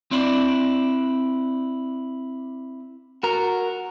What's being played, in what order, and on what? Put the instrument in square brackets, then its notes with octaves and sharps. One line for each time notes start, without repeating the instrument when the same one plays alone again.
[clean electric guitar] C4 D4 E4 D5
[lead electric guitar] F#4 A#4